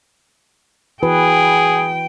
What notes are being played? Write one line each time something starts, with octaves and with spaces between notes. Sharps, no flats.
E3 F#4 G#4 B4 G5